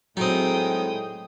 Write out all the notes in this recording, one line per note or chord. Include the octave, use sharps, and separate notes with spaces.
A2 F#3 G#3 C4 D#4 G5 D#6